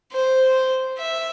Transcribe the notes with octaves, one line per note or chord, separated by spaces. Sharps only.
C5
E5